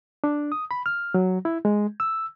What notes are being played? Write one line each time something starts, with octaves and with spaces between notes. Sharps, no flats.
D4
D#6
B5
F6
F#3
E4
G#3
E6